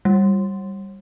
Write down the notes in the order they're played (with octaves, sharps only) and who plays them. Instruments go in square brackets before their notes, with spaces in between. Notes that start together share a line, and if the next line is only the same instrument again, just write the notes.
[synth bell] G3